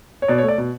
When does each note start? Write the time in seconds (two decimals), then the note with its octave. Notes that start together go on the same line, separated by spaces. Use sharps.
0.22 C#5
0.28 B2 D5
0.38 C#5
0.43 A3
0.48 D5
0.58 B2